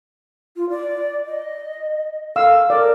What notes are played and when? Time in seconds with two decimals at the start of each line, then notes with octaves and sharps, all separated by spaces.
0.56 F4
0.70 D5
1.25 D#5
2.36 A4 F5 E6
2.70 A#4 D5